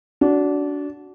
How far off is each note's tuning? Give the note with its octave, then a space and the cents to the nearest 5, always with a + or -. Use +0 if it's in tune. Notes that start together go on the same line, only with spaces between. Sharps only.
D4 -20 F#4 +0